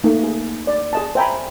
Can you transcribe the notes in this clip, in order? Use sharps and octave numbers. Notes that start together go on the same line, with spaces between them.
A3 A#3 D#4
G#4
D5
G#4 D#5 A5
C5 E5 G5 G#5 A#5 B5